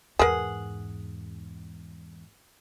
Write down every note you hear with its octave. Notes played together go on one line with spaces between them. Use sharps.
E2 G#2 G#4 A#4 B4 F#5 A5